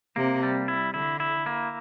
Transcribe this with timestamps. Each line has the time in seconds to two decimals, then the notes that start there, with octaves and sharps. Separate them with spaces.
0.16 C3 A#3
0.43 G3
0.68 E4
0.94 D3 E4
1.20 E4
1.46 A#3